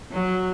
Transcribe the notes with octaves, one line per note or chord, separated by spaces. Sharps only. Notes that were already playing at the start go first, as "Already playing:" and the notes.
F#3